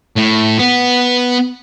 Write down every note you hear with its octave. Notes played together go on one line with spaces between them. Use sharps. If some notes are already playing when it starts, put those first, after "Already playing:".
A2
B3